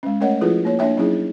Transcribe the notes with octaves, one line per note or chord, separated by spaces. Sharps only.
G#3 C#4
A3 C#4 A#4 C#5 D#5 F#5
F3 E4 F4 G#4 A4 B4
A#3 C#5
A#3 D4 C#5 E5 G5
F#3 C#4 D#4 E4 G#4